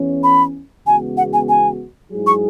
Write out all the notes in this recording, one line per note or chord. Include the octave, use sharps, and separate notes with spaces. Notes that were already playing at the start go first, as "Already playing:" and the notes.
Already playing: E2 E3 C#4
B5
E2 C#3 G#3 B3 F#4 G#5
F#5
G#5
G#5
G#2 F#3 E4 G#4
C#6